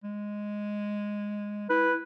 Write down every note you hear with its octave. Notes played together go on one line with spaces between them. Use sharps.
G#3
E4 B4